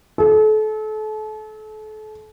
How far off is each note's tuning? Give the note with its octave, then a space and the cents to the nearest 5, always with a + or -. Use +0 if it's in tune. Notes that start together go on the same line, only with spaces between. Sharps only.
A4 -35